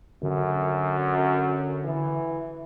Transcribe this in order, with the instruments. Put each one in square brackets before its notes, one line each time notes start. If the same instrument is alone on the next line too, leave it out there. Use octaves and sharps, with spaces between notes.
[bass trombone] F#2 [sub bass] D3
[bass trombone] E3